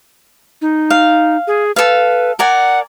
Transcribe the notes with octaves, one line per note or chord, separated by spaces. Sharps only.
D#4
F5
G#4
A4 B4 F5
A#4 D5 F#5 G#5